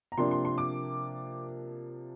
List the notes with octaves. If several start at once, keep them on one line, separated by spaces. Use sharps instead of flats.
A#5
C3 F3 A#3 D4 C6
C6
C6
D6